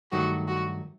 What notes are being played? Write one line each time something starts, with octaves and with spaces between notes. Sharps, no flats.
G2 D#3 F#3 A3 F#4
F#4